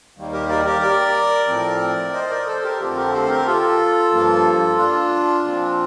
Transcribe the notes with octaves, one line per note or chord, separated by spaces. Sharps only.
D#2 D#3 G3 A#3
G4 A#4
A#4 D5
G4 A#4
A#4 D5
A2 F3 C4
C5 D#5
A#4 D5
A4 C5
G4 A#4
F2 D3 F3 A3 C4 F4 A4
G4 A#4
A4 C5
A4
G4 A#4
F4 A4
G2 F3 A#3
D4 F4
A#2 F3 C4